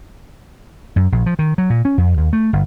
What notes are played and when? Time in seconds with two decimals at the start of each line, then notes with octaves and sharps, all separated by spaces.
0.96 F#2
1.12 A#1
1.26 F3
1.39 D#3
1.58 F#3
1.70 A#2
1.85 C#4
1.98 F2
2.18 D#2
2.33 A3
2.53 G1